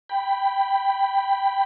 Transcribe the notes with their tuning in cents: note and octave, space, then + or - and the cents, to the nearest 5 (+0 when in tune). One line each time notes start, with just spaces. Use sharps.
G5 +0 B5 +5